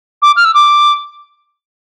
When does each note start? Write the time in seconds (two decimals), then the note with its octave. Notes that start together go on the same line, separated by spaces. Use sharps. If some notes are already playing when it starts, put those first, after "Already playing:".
0.22 D6
0.36 F6
0.45 E6
0.54 D6